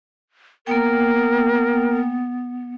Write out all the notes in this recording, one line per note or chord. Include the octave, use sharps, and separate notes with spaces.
A#3 B3 A#4 G5